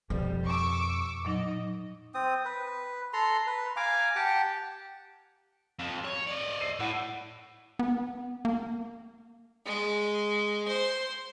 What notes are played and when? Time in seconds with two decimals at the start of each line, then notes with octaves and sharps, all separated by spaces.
0.10 F2 B2 G3
0.44 C#6 D6 E6
1.25 A#2 F#3 D#4 D#5
2.14 C4 D#6
2.45 B4
3.13 A4 A#5 C6
3.47 B4
3.76 F5 G#5 A#5 D6
4.16 G4 F#5 G5 A5
5.79 F2
6.05 C#5
6.27 D5 D#5
6.41 D7
6.61 E6 C7 D#7
6.79 A2 E4 F#5
7.79 B3
8.45 A#3
9.65 G#3
10.68 C5